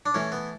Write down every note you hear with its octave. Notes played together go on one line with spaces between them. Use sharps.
D4
A2 E3 C#4
B3